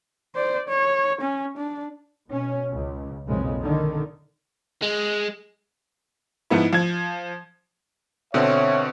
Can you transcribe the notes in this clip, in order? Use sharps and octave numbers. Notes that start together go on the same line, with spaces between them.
C5 D5
C#5
C#4
D4
B2 C#4
C#2
B1 F2 A#2 C#3 G#3
D3 D#3
G#3
G#2 F3 B3 E4
F3 G#6
B2 D3 C4 C#5 E5